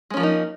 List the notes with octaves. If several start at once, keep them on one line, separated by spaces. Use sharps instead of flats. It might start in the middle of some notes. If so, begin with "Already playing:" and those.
F3 G#3 A#3 C#4 D#4